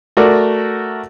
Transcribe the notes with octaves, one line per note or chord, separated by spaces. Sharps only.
A3 F#4 A#4 D5